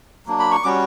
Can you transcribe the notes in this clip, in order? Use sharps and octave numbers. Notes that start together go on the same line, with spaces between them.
F#3 A#3 D4
B5
C#6
G3 C#4 F#4 D6